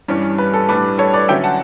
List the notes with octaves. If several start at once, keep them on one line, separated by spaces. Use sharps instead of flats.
G2 E3 G3 C#4
B4
A4
A2 G3 D4 B4
A4 C#5
B4 D5
D3 F#3 C#4 E5 G5
F#5 A5